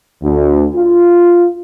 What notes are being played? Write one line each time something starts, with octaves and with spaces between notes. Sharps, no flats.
D2
F4